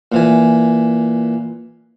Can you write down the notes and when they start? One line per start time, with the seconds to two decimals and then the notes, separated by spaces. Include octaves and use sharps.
0.12 A#2 E3 G#5